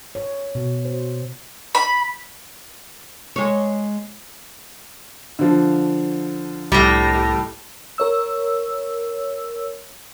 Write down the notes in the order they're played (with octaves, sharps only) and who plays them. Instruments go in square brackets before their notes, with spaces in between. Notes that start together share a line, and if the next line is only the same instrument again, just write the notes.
[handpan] C#5
B2
C5
[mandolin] B5
[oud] G#3 C#5
[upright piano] D3 F3
[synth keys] C2 A#6 [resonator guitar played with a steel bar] A2 G3
[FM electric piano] A#4 C#5 E6